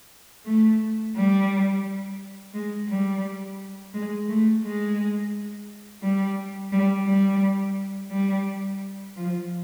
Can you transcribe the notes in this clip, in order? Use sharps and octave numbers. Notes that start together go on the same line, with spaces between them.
A3
G3
G#3
G3
G#3
A3
G#3
G3
G3
G3
G3
F3